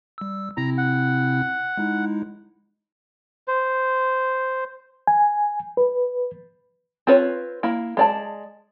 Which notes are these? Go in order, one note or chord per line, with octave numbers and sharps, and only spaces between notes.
G3 E6
C3 C4 E4 A#5
F#5
G#3 D#4 E4
C5
G#5
B4
C4 F4 B4 C#5
A#3 E4
G#3 D5 A5